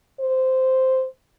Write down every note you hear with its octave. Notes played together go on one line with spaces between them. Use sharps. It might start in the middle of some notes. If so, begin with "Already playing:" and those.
C5